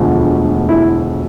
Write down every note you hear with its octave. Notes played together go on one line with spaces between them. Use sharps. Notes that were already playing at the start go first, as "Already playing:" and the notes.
Already playing: E1 D2 D3 F3
E4